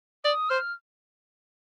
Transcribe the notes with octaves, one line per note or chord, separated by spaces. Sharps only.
D5 D#6
C5 F6